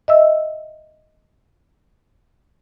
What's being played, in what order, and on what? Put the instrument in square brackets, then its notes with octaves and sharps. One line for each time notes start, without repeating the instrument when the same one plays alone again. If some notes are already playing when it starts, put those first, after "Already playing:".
[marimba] D#5 E5 E6